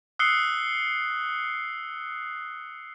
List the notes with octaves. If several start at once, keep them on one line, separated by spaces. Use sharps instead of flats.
D#6 E6 F#6 C7 C#7 G7